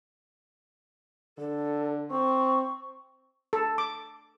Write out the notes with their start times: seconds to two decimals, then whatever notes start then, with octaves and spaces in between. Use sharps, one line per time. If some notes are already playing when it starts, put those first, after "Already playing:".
1.38 D3 A4
2.11 C4 C#6
3.53 A4
3.78 D6